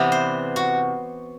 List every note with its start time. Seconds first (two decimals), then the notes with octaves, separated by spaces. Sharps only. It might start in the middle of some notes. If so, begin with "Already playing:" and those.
Already playing: C3 E3 B3 D5
0.12 C5
0.56 F#4